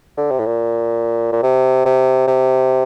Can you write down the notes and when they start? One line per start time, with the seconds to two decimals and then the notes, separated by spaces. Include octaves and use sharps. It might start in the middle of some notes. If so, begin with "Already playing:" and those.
0.17 D3
0.31 C3
0.39 A2
0.46 A#2
1.32 A#2
1.43 C3
1.85 C3
2.27 C3